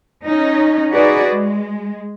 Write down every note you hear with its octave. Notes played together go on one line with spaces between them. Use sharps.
C#4 D#4
D#4 F#4 G#4 B4 D5
G#3